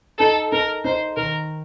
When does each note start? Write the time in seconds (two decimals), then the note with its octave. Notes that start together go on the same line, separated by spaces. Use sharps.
0.20 D#4 A4
0.52 D#4 A#4
0.84 D#4 C5
1.17 D#3 A#4